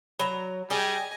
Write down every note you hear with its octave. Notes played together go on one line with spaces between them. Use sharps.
F#3 A#5 B5
G3 G#4 D#5 G5 G#5